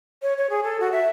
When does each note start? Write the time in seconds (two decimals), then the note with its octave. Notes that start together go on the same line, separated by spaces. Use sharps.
0.22 C#5
0.38 C#5
0.50 G#4
0.64 A4
0.80 F#4
0.92 E5